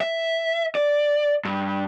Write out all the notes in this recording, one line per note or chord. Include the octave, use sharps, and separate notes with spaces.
E5
D5
G2